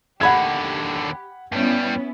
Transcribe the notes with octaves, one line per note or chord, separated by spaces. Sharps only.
D#2 D3 G4 F#5 B5 G#6
G2 G3 B3 C#4 E4